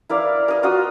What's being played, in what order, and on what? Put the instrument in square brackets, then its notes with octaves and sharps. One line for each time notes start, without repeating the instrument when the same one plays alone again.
[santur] E4 A#4 D5 F5
A#4 D#5
F4 F#4 D#5 D#6